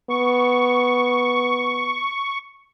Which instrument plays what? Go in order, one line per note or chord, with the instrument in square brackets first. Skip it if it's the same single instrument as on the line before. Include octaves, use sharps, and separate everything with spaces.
[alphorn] B3 [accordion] C#6